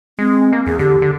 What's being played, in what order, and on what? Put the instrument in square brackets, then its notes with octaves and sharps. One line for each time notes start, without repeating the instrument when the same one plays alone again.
[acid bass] G#3 [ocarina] C4
[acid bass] A#3
[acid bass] E2 [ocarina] G#4
[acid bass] D3 [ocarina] G4
[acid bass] D3